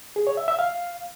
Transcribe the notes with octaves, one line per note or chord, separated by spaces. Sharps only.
G#4
C#5
E5
E5
F5